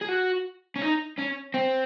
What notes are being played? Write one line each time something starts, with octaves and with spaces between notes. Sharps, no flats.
G#4
F#4
C#4
D#4
C#4
C4